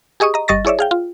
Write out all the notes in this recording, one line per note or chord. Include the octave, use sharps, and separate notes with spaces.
G4 G#4 D#5 C#6 D#6
D#5 A#5
G1 G3 D#5 C#6 A6 A#6
E4 G#4 C#5 D5 E5
G#4 F5 G5
F4